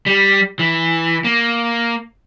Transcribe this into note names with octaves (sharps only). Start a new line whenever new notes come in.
G3
E3
A#3